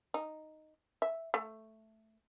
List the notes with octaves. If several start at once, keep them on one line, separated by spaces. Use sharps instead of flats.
D#4
E5
A3